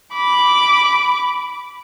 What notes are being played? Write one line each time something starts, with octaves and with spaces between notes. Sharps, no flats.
B5 D6